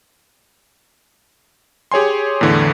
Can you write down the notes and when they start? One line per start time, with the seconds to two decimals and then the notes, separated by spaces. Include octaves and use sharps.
1.92 G4 G#4 C#5 G#5 C6
2.41 E2 A2 D3 E3